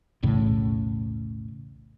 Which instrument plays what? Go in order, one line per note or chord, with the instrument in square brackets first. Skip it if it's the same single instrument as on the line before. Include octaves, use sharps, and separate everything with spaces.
[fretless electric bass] B1 E2 A2 C#3